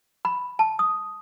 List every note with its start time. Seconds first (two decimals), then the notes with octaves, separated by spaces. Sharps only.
0.25 B5
0.59 A5
0.79 D#6